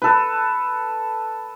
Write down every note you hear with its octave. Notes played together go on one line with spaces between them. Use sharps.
A4 B4